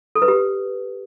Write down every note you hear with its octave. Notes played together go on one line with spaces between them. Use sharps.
A4
B4
G4